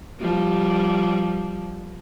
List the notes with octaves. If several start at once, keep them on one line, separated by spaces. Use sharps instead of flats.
F3 G3